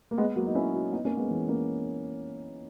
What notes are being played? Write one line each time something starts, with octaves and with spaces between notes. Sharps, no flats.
A#3
G#3 B3
F#3 A#3
D#4
C#4 E4
D#4 F#4
B3 D#4
A#3 C#4
G#3 B3
E3 G#3
A#3 C#4